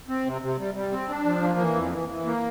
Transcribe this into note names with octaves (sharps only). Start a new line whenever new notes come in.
C4
C3
C3
G3
G3
C4
D4
F3
A#3
E3
F2
E3
E3
A#3